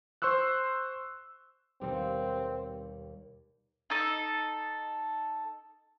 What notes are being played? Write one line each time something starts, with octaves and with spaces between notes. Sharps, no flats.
C5 C6 C#6 E6 F#6
D#2 B2 G3 C4
D#4 A4